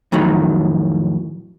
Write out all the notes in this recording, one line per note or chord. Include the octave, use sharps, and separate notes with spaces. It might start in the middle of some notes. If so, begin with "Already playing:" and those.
F2 A2 D#3 F#3